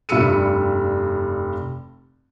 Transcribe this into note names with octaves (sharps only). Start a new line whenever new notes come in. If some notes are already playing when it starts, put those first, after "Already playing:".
F1 G2 G3 E6 C#7 D#7